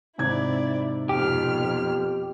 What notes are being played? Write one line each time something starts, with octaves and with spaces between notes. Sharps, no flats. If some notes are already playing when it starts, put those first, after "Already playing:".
G#2 C3 E4 D5 G#6
F2 B2 G4 F6